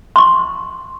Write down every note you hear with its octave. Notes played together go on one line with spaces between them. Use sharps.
C6 C#6